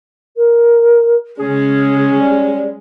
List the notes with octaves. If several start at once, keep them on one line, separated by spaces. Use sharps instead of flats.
A#4
C#3 G#3 C#4 G#4
G3